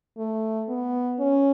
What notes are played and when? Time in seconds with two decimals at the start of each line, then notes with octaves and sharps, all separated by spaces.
0.18 A3
0.69 B3
1.20 C#4